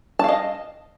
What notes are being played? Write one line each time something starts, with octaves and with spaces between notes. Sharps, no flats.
D#5 F5 A5